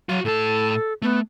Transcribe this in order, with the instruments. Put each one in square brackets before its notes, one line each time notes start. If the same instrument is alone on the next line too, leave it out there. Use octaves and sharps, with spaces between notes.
[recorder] F#3 [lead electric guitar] F#4 F5
[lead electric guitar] A2 A5 [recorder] A4
[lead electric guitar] A3 [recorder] B3